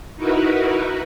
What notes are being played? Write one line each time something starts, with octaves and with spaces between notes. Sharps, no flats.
D#4 E4 F#4 A#4 B4